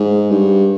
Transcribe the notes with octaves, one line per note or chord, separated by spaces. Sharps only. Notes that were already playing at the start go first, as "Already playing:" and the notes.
Already playing: G#2
G2